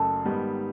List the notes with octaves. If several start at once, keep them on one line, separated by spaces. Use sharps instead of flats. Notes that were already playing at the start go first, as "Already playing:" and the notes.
Already playing: F#1 F#2 F#3 A3
G#2 D#3 G3 B3